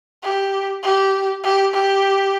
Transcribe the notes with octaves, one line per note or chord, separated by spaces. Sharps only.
G4
G4
G4
G4